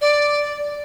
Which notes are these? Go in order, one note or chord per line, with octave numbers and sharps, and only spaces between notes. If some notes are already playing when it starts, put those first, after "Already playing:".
D5